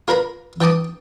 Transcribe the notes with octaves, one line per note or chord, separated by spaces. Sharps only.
F4 A#4 B4 A#5 B5
E3 G5 A5 D6 D#6